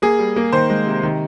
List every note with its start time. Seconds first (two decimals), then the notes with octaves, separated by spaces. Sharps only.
0.02 A#3 G#4
0.19 G3
0.36 A#3
0.52 D#3 C5
0.70 G#3
0.86 C3
1.03 D#3